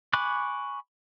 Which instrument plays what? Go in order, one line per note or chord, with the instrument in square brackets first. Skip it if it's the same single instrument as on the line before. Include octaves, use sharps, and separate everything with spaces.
[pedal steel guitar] G#5 B5 C#6 D6 F#6